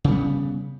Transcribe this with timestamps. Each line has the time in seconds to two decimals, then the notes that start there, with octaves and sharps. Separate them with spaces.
0.04 C#3
0.08 G3
0.11 B3